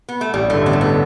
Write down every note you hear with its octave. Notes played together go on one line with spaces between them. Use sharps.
B3
A3
A1 G3
G2 D3 A3
A1 B3
A3
D3 B3